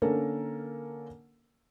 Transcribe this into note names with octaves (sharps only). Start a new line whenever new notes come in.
D3 A#3 C#4 A4 A#4